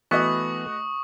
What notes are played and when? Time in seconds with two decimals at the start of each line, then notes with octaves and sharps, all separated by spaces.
0.11 E3 A3 B3 F#4 D#5 C#6 D#6